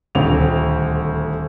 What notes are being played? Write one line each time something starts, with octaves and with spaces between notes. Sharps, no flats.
D#1 D2 C4 F7